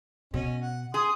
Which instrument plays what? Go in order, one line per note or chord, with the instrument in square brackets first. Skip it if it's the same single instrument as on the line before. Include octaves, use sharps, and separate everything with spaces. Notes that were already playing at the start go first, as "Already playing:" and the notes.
[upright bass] B2 [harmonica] C#4 D#5
[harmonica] F#5
[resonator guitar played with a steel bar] G#4 [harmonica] C6 D#6